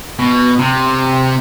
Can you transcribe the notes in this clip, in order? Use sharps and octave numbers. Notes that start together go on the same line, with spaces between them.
B2
C3